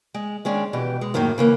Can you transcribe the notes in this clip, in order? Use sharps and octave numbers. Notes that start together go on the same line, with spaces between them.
G#3
D#3 G#3 C#4 D4
B2 E3 G4 B4
G#3
F#2 A2 D#3 F#3 A#3
C#3 E3 A#3